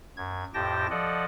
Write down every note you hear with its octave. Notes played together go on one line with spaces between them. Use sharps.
F#2 G#6
F2 A2 G4 G5 A5 A#6
F3 A4 D5 D#5 F#5